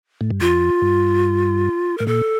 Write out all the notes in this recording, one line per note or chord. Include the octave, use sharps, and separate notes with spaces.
A2
G2
F2 F4
G2
A2 A#4
A#2 A4